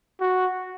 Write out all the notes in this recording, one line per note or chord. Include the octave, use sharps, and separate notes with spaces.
F#4